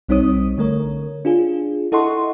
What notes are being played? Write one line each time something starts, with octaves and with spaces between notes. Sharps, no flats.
B1 G3 C4 D#4 C#5 D#6
D3 A3 A#4 C#5
D4 F4 G#4
E4 A4 D#5 F#5 C6 C#6